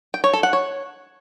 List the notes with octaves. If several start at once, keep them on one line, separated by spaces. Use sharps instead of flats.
G5
C#5
A4
F#5
C#5